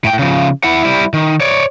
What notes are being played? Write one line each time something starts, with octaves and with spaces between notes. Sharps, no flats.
A2 G5
C#3 F3
E4 F#5
G3 E4
D#3
C#5 D5